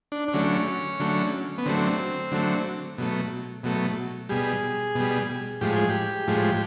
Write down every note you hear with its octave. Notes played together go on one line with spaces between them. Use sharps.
D4
D4
D3 F#3 A3 C#4
D3 F#3 A3
B3
D3 F#3 A3 C4
D3 F#3 A3
B2 F#3 A3
B2 F#3 A3
B2 G3 G#4
B2 G3
A2 F3 G#3 G4
G#4
G4
A2 F3 G#3